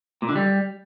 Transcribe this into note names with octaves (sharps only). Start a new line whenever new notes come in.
A#2
D3
G3